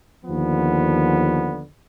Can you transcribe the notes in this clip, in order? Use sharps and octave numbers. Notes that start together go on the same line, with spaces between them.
D#2 D3 F3 B3